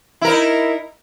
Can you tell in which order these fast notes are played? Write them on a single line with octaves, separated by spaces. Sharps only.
E4 A#4 D#4